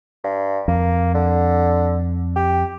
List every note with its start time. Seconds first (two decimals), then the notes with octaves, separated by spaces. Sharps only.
0.24 G2
0.68 F2 A#3
1.14 D3
2.36 G4